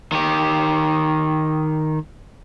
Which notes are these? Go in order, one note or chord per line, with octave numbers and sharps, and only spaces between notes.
D#3 G4